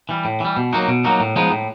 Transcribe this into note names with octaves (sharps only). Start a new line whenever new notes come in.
E3 G3
A2
E3 G3
B2
F#3 A#3 D#4 F#4
B2
F#3 A#3 D#4 F#4
A2
F3 G#3 B3 D#4
A2